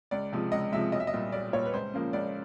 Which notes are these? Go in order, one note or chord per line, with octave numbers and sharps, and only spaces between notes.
C#2 D5
C3 F3 G#3
C#2 D#5
C3 F3 G#3 E5
B1 D#5
E5
D#5
A#2 G3
B1 D5
A#2 G3 C#5
B4
C#2 C5
C#3 F3 A#3
C#2 D5